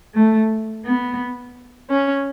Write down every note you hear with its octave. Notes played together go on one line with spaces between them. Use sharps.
A3
B3
C#4